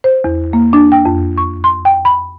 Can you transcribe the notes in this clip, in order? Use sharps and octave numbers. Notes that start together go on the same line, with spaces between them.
C5
E2
A#3
D4
G5
F2
C#6
C6
G5
B5